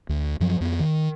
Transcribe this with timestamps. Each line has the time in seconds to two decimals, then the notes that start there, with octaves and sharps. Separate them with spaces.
0.09 D2
0.40 F#2 F3 F#3
0.61 F2 B3
0.80 D#3